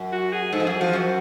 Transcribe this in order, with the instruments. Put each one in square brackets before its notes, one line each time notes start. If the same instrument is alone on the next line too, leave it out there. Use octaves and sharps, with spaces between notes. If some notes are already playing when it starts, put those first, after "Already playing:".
Already playing: [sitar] F#2
[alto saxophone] F#4
G#4
[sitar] G#2 [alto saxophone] A4
[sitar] F3
[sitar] F#2 [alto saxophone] G#4
[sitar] F3 [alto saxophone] F#4
[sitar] F#2